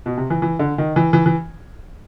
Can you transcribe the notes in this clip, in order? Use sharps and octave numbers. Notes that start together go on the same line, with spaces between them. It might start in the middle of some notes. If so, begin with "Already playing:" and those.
B2
C3
E3
E3
D3
D#3
E3
E3
E3